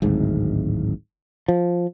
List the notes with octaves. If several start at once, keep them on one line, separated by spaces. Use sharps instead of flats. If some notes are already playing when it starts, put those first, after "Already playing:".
D1 G#1 G#2
F3